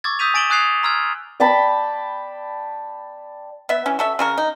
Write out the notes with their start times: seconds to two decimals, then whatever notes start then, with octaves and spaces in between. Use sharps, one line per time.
0.04 C#6 D6 E6 G#6 A6
0.19 D#6 E6 G6 B6 D#7 F7
0.34 G#5 A6 D7 E7 F#7 G7
0.50 G#5 D#6 F#6 G#6 C7 F7
0.83 A#5 C6 E6 F6 G#6
1.40 D5 G5 A5 B5
3.69 B3 E5
3.86 E3 C#4
3.99 F#4 A4 E5
4.19 C#3 F#4 A#4
4.38 D#4